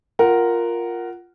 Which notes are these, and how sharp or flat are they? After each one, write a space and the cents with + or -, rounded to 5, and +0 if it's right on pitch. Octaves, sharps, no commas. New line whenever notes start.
F4 +0 A#4 +0 F#5 +10